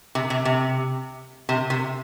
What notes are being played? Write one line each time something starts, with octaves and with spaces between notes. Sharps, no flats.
C3
C3
C3
C3
C3